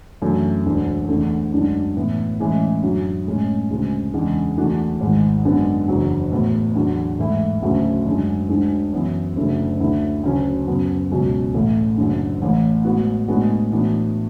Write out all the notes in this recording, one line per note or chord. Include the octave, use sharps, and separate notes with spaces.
F#2 E3 A3 D4 F#4
E1 D2 D3 A3
E2 D3 A3
F#2 D3 G#3 D4
A2 E3 B3 E4
A2 E3 G#3 C#4 E4
F#2 D3 F#3
A2 G#3 C#4
D2 C#3 G#3
E2 C#3 G#3 D4
E2 D3 A3 D4 F#4
G#1 G#2 G#3
F#2 D3 G#3 B3
F#1 E2 D3 F#3
A2 E3 B3 F#4
E2 D3 F#3
G#2 E3 A3 E4
D2 C#3 F#3 A3 E4
F#2 D3 G#3
D2 D3 G#3 D4
F#2 E3 B3 F#4
F#1 F#2 D3 A3 E4
D2 D3 A3 E4
D2 C#3 F#3 C#4
F#2 C#3 F#3 B3
C#2 B2 F#3 C#4
A1 A2 E3 A3
F#1 F#2 D3
A1 A2 E3
A2 G#3 B3 F#4
A2 G#3 B3 D4 F#4
A2 E3 B3 D4 F#4